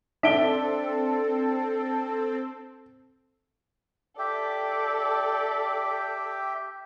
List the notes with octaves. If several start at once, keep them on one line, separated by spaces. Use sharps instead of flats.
C4 D4 A4 E5 D7 G7
G4 A4 D5 E5 G5